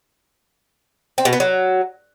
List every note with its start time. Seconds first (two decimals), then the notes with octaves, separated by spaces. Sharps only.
1.18 C4
1.25 B2
1.33 B3
1.40 F#3